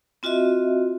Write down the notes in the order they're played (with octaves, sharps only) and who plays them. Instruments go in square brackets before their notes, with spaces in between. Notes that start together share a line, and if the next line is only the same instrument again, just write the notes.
[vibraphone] C4 F4 F#4 D#5 E5